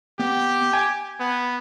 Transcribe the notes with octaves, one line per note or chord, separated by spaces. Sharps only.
B3 G4
G5 G#5
B3